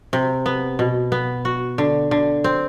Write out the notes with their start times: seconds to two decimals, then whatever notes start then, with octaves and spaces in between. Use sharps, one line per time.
0.13 C3
0.46 B3
0.79 B2
1.12 B3
1.45 F#4
1.78 D3
2.11 D3
2.44 C4